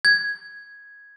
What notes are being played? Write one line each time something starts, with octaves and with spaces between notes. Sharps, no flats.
G#6